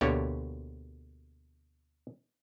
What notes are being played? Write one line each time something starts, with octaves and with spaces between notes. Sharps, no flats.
D2 B2 D3 A#3 G4 C#5